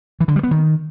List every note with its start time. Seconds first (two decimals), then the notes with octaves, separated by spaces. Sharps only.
0.20 E3
0.28 D3
0.36 G3
0.43 B3
0.51 D#3